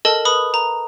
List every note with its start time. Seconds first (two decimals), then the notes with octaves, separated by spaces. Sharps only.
0.05 A4 A#4 D#5 A5
0.25 B4 B5 D#6
0.54 A#5